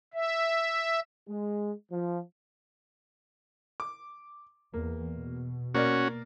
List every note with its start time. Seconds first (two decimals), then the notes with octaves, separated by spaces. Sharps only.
0.14 E5
1.28 G#3
1.90 F3
3.80 D6
4.74 E2 A#3
5.17 B2
5.75 A#3 C#4 F#4 A#4 D5